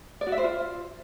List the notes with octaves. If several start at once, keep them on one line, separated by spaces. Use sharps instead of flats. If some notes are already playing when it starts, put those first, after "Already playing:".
D5
F#4
E5
C5
F4